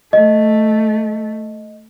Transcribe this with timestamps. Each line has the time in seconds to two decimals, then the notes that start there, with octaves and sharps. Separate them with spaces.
0.13 A3 D#5